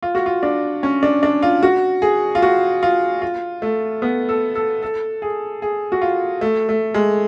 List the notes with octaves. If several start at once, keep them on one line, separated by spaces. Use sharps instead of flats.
F4
F#4
F4
D4
C#4
D4
D4
F4
F#4
G#4
F4
F#4
F4
F4
A3
B3
A4
A4
A4
G#4
G#4
F#4
F4
A3
A3
G#3